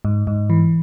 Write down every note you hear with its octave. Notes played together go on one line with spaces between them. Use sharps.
G#2
G#2
E3